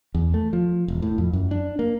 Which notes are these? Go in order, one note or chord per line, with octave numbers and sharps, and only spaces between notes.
E2
A3
F3
E1
A2
F2
F#2
D4
A#3